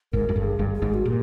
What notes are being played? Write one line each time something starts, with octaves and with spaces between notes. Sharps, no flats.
G#1 G#2 A#4
F#2
G1 G2 A4
G#4
G1 G2
G#4
G#1 G#2
F#4
A#2 G4